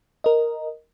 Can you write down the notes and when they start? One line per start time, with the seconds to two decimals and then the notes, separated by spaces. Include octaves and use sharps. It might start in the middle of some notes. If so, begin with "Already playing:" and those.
0.24 A#4 D#5